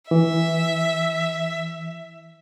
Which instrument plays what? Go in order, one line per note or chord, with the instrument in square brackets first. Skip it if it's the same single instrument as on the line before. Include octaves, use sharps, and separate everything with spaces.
[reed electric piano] E3 [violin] E5